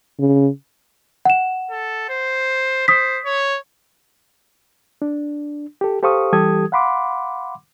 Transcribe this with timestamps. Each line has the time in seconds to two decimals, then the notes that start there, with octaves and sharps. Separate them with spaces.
0.19 C#3
1.25 F#5 E7
1.71 A4
2.09 C5
2.88 C5 D#6 B6
3.25 C#5
5.02 D4
5.81 G4 A4
6.03 G4 A4 C5 F5 C#6 D#6
6.33 E3 G3 G4 A4 D#6 G#6
6.72 F5 F#5 B5 C6 D6